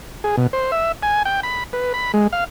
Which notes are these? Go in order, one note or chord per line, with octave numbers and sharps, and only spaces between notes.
G#4
B2
C5
E5
G#5
G5
B5
B4
B5
G#3
F5